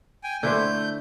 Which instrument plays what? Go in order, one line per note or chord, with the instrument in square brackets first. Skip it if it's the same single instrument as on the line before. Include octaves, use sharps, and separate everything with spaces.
[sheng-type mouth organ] G5 G#5
[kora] D3 E4 C5 [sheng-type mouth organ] A3 G6